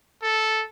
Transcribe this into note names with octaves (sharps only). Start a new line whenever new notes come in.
A4